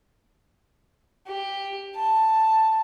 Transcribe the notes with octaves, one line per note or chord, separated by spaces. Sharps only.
G4
A5